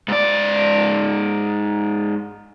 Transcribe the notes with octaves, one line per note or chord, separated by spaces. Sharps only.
G#2 D5